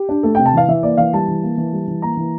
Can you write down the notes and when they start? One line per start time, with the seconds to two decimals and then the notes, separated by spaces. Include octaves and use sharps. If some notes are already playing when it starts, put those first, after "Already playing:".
Already playing: G4
0.09 D4
0.23 A3 A4
0.35 C3 G5
0.46 A5
0.53 E3 F5
0.68 E3 E5
0.83 A#3 D5
0.97 E3 F5
1.13 G3 A5
1.28 E3
1.43 A#3
1.58 E3
1.73 G3
1.88 E3
2.02 A#3 A#5
2.17 E3